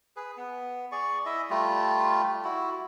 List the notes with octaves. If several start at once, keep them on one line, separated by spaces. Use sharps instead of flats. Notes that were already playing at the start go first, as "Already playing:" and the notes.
G#4 B4
B3
G#4 D5 C#6
E4 D#5 E5
G3 A3 F4
E4 F#4